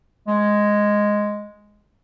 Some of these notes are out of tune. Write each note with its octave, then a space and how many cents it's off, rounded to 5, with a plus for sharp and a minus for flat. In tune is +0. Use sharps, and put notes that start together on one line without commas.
G#3 +0